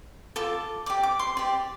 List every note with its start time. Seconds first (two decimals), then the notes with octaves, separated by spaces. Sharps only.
0.36 F4 A4 D6
0.86 G4 D5 D6
1.03 D6
1.19 C6
1.37 G4 D5